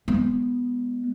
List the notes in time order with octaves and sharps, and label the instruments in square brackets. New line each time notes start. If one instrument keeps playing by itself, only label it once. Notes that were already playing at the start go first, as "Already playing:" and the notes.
[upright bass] G#3 B3